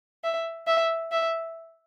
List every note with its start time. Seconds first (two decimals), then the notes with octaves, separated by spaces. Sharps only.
0.24 E5
0.67 E5
1.12 E5